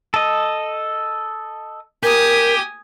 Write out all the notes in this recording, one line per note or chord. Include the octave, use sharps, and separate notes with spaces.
A4 D#5
G4 A#4 G#5 D#6